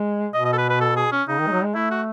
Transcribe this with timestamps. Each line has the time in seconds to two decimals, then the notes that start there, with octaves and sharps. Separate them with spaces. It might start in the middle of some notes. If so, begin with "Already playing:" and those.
Already playing: G#3
0.34 B2 D#5
0.45 D#5
0.53 A4
0.58 B4
0.70 B4
0.81 A4
0.96 G#4
1.12 C#4
1.28 C#3 D#4
1.40 D#3
1.47 G#3
1.51 F#3
1.63 G#3
1.75 A3 E4
1.91 F#4